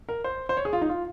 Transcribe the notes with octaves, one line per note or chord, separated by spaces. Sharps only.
A#4
C5
C5
C#5
G#4
F4
D#4
F4